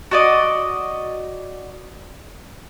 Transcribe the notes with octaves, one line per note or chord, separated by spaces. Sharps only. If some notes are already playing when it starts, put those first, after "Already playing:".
F#4 D5 D#5